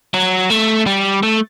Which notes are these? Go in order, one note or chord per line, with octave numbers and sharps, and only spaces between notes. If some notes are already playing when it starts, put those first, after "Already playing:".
F#3
A3
G3
A3